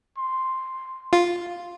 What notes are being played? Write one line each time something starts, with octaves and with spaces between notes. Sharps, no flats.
C6
F4